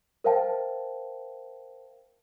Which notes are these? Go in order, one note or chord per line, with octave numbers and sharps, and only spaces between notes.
A#4 C5 E5 F5 G5 A5